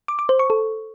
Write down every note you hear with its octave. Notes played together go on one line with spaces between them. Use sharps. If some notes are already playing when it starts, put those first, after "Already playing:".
D6
D6
C5
C#6
A4